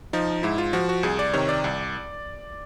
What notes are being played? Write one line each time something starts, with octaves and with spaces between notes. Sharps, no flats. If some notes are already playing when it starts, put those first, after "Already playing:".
F3 D#4
G#2 E4
F4
F3 F#4
F#4
C2 G#4
D5
C3 D#3 C#5
D5
C2